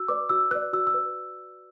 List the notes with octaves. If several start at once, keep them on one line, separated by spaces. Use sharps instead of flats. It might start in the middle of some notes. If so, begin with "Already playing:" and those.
Already playing: F#4 E6
B4 D5 D6
F#4 E6
B4 D5 F#6
F#4 E6
E6
B4